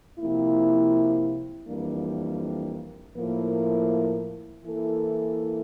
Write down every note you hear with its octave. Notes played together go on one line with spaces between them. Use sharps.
C3 F3 A#3 E4
F2 E3 G3 A#3 D4
A2 F3 A#3 E4 A#4
E3 A#3 E4 A4